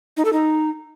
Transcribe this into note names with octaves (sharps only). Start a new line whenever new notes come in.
D#4
A4
D#4